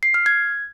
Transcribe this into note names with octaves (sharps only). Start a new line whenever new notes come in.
C7
F6
G#6